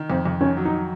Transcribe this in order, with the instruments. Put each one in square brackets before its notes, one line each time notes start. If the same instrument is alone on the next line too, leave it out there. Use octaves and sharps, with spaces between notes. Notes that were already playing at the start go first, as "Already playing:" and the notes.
Already playing: [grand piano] D#3
[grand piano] F2 [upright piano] C4
[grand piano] F2
[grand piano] D#3 [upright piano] C#4
[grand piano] F#3
[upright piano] D#4